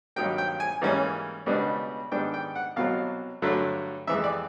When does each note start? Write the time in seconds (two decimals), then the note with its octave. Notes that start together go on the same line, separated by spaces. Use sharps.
0.16 G2 D#3 F#3 A#3 G5
0.38 G5
0.60 G#5
0.81 G#2 E3 G3 A#3 C#4
1.46 C#2 B2 G3 B3 D4
2.12 G#2 D#3 G3 B3 D4 G5
2.34 G5
2.55 F#5
2.76 C2 B2 F#3 F5
3.42 G2 D3 F#3 A3
4.07 F2 C3 E3 G#3 E5
4.24 D5